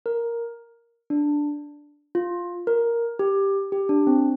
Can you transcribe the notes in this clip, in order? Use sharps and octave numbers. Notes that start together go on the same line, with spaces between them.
A#4
D4
F4
A#4
G4
G4
D4
C4